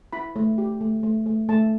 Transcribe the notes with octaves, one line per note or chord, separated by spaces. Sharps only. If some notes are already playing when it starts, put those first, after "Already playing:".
E4 B5
A3
G4
A3
A3
A3
A3 A5